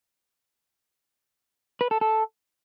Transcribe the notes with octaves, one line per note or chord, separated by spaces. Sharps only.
B4
A4
A4